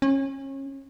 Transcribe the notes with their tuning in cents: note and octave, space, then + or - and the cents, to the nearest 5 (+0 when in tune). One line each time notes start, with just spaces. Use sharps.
C#4 -30